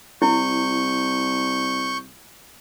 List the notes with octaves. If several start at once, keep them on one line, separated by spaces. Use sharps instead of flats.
C2 E4 C#6 G6